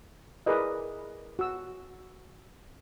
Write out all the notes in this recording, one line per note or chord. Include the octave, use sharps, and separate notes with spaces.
E4 G#4 A#4 B4 D5 D#5
F#4 E6